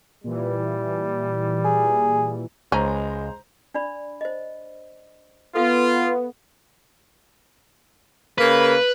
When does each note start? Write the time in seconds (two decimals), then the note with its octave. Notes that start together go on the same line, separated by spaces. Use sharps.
0.24 A#2 E3 G3
1.65 G#4
2.72 C#2 G#3 C#4 C5 A#5
3.74 D4 D5 B5
4.21 C5 D#5
5.55 B3 F4 A4 F5
8.38 C#3 A#3 B4